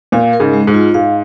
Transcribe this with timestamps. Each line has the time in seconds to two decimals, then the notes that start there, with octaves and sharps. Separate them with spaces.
0.12 A#2 F5
0.33 A#4
0.40 G#2 C#3
0.54 G#3
0.67 G#2
0.74 F4
0.94 G#2 F5